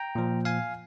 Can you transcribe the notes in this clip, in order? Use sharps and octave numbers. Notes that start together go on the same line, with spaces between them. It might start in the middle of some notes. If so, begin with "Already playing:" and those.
Already playing: G5 A#5
A#2 F3
F5 G#5